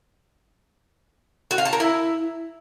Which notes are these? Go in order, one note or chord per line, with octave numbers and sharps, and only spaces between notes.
F#4
F5
A5
A#4
E4